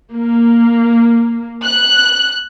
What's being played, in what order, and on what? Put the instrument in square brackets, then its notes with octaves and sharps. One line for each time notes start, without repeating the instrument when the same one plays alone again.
[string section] A#3
F#6